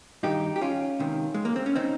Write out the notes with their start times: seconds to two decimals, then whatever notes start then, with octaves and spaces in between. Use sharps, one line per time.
0.23 G2 D#3 D#4 G4
0.56 G4
0.61 C#4 F4
0.99 C#2 C3 D#3
1.34 G#3
1.45 A#3
1.56 C4
1.66 C#4
1.76 C#3 C4 D#4